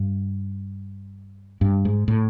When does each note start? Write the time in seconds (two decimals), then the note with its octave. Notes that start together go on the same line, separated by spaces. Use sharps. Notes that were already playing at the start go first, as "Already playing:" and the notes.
Already playing: G2
1.61 G2
1.85 G#2
2.08 A2